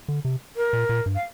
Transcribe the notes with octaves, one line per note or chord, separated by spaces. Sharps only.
D3
C3
A#4
A#2
A#2
G2
F5